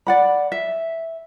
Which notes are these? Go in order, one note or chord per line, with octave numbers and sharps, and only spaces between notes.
D5 F#5 B5
E5